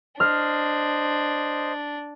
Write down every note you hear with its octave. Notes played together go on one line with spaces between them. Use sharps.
D4 C5 D#5 F6